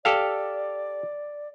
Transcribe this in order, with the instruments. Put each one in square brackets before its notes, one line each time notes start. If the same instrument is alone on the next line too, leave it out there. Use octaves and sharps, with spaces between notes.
[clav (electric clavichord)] G4 A4 F5 [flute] D5